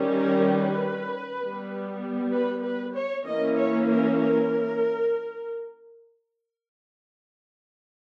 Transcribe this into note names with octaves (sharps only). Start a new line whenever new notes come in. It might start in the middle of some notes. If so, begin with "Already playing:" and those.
Already playing: D#3 G3 C#4
A#4
B4
G3 B3
B4
B4
C#5
E3 A#3 C#4 D#5
C#5
A#4
A#4